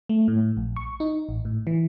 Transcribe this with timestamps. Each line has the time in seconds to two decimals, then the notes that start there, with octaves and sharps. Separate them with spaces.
0.09 A3
0.28 A2
0.57 A#1
0.76 C#6
1.00 D#4
1.29 A1
1.45 A2
1.67 E3